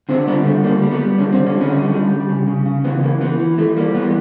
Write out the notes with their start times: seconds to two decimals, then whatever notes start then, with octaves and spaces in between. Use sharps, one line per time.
0.09 D3 C4
0.27 G3 B3
0.45 D3 A3
0.63 G3 A#3
0.82 G3
0.92 B3
1.00 G3
1.18 D3 C#4
1.32 C4
1.37 D3
1.46 C#4
1.55 G3
1.61 C#4
1.74 D3
1.92 G3
2.11 G3
2.29 C#3
2.47 C#3
2.66 C#3
2.84 E3 B3
3.03 E3 A#3
3.21 E3 B3
3.39 E3
3.58 E3 A3
3.76 G3 A#3
3.94 E3 B3